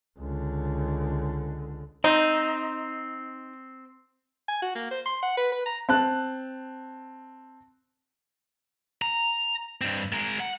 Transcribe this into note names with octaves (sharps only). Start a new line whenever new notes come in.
C#2 D3
C4 D#4
G#5
F#4
A#3
C5
C6
F#5
B4
B4
A#5
C4 A5 F#6
A#5
G2 C4
G#3 A#4
F#5